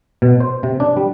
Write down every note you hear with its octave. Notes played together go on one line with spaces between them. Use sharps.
B2
C5
C3
D4
G3